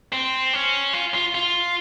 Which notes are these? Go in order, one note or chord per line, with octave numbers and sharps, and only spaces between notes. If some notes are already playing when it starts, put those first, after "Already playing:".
C4
C#4
F4
F4
F4